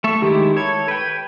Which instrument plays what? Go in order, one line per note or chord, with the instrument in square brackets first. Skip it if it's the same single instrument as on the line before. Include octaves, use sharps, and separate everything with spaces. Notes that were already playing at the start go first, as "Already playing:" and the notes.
[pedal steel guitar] A3 A4 E5 [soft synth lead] C#6
[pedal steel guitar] D#3 G#3 E4 [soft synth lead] G4
[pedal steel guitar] A4 C#5 [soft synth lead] G#6
[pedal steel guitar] B4 G5